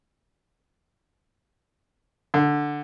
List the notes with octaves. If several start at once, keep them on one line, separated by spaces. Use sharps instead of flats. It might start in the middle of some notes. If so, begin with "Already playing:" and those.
D3